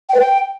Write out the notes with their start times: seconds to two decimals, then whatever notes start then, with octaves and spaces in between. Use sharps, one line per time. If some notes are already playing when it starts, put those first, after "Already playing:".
0.09 G5
0.14 B4
0.19 G5